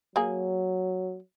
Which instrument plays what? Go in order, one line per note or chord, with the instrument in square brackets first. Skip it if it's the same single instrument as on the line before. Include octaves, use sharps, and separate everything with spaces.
[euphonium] F#3 [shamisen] A#3 G#4